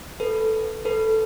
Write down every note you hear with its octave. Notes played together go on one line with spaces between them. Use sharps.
A4 B4
A4 B4